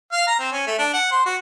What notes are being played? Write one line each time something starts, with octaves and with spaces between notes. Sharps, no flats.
F5
A#5
C4
C#4
A3
D4
F#5
C5
F#4